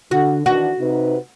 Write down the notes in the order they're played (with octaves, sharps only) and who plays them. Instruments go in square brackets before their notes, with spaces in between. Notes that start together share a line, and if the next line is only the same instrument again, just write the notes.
[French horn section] D3 [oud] F#4
[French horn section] D#3 E3 D4 [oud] F#4
[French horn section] C3 D#4 B4